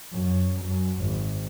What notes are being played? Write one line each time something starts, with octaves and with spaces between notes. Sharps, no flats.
F#2
F#2
G#1